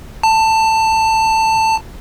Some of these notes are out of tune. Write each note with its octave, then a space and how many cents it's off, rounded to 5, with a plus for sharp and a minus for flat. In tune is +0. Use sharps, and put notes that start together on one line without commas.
A5 +15